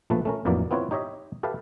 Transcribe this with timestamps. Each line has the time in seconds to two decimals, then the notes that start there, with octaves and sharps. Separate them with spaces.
0.10 A#1 F3 A3 B4 A5
0.25 A3 C#4 A#4
0.45 A1 F2 E3 F#3 A#3 D5
0.71 B3 C4 E4 F4 B4 C#5
0.91 D#4 G4 C#5 D#5 E5
1.43 G4 A4 B4 E5 F5